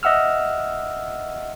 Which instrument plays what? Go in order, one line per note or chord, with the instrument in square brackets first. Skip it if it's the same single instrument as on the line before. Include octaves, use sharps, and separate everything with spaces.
[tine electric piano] D#5 E5 F#5 E6 F6